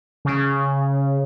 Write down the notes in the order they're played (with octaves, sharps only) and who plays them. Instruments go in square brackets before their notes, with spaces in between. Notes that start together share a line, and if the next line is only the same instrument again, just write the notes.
[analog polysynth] C#3